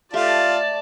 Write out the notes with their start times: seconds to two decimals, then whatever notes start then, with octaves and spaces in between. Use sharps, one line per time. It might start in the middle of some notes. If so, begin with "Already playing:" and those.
0.13 A3 F4 G4 D5 A5